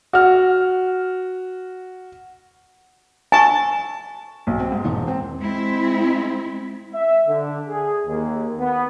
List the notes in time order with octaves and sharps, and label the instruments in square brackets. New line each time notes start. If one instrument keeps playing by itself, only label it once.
[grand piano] F#4 F6
[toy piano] G#5 C#6 [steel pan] A5
[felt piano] B1
C4
G#2
E1
C4
[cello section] G#3 C4 E4
[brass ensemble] E5
D3
G#4
D#2
B3